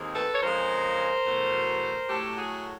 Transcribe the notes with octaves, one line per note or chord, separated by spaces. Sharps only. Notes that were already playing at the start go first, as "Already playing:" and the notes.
Already playing: D#2 D#3 G#3 C4
A4 B4
C#5
F2 C#3 F3 G#3 A#4 C5
E2 B2 F#3 A3
A2 F#3 A3 G4 A4
F#4 G#4